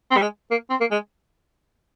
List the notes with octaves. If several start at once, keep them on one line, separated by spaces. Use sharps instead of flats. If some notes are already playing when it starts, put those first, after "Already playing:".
C4
G3
G#3
A#3
C4
A#3
G#3